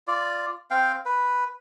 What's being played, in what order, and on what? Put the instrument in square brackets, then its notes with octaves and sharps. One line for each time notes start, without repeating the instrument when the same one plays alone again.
[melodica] F4 D5
C4 F5 G5
B4